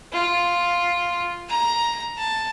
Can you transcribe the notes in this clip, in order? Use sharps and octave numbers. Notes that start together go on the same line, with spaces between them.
F4
A#5
A5